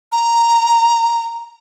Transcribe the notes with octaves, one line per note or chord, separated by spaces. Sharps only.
A#5